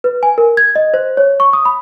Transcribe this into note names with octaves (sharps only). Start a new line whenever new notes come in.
B4
G#5
A#4
G#6
D#5
C5
C#5
C#6
D#6
B5